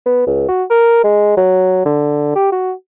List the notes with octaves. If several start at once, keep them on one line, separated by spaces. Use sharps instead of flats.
B3
C#2
F#4
A#4
G#3
F#3
D3
G4
F#4